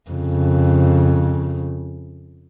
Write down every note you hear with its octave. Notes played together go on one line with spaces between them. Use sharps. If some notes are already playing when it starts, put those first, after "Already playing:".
F2 C#3